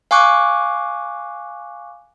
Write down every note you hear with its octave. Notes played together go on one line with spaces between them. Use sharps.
F5 G#5 C#6 D6 F#6